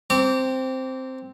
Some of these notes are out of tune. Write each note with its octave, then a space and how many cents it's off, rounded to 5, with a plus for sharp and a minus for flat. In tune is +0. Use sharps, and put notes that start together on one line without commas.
C4 +0 A#5 -40 D6 -25